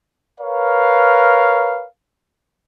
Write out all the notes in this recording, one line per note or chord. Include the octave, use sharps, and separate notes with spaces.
A#4 B4 C#5 F5